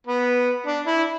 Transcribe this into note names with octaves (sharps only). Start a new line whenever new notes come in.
B3
D4
E4